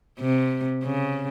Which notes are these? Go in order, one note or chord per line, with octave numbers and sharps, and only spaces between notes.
C3
C#3